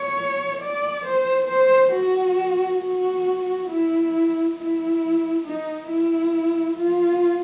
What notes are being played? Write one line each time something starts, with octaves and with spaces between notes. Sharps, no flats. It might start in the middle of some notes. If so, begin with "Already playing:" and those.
Already playing: C#5
D5
C5
C5
F#4
F#4
E4
E4
D#4
E4
F4